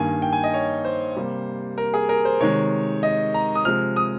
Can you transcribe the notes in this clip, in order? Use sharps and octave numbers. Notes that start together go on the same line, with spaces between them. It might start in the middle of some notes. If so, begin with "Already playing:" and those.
Already playing: G2 D#3 A#3 G#5
G5
G#5
D#5
C#5
C5
C3 G3 A#3
A#4
G#4
A#4
C5
C3 D#3 G#3 C#5
D#5
A#5
D#6
C3 F3 G#3 F6
D#6